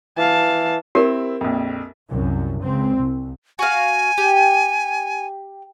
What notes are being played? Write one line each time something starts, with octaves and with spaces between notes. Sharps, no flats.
E3 F5 A5
C4 E4 G4 A#4
A#1 F2
C2 F#2
C#2 C4
C2
F#4 F5 G#5
G4